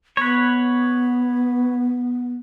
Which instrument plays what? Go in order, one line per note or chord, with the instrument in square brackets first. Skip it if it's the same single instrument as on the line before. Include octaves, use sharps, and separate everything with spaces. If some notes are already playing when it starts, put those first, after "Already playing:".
[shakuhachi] B3 [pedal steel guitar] B4 C#5